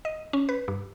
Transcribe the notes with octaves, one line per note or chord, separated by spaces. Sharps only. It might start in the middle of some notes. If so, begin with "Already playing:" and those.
D#5
C#4
B4
G2